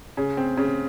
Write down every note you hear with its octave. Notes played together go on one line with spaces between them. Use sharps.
C#3
C4
C#3